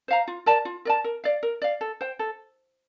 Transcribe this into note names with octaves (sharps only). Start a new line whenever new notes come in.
C5 F5 A#5
F4
A#4 D5 A5
F4
A#4 D5 A5
A#4
D5 F5
A#4
D5 F5
A4
C5 G5
A4